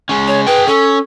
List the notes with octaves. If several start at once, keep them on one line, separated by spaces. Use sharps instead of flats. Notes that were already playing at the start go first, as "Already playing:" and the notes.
G#3 C#4
C#5
G#4 B4 G5
C#4 A4